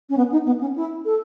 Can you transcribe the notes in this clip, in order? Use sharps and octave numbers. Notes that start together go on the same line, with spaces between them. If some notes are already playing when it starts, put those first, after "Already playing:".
C#4
B3
D#4
B3
C#4
E4
A4